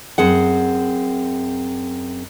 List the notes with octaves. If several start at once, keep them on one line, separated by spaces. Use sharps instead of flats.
F#2 C4 G#4 F#5